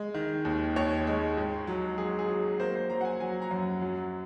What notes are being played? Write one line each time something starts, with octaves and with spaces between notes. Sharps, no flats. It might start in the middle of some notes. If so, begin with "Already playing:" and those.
Already playing: G#3
D#3
D#2
D#2 C#5
G#3
G#2
F#3
F#3 G#4
G#4
F#3
A#3 C5
C5
F#3 A#5
F#5
G#5
F#3 G#5
A#5
F#2
F#3